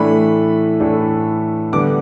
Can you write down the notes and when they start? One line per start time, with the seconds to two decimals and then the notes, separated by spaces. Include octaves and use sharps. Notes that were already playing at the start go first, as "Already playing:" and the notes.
Already playing: A2 E3 A3 D4 B5
0.80 A2 E3 A3 D4
1.73 D3 G3 B3 D6